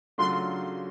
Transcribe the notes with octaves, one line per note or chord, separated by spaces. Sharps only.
C#3 F#3 A3 D4 F4 C6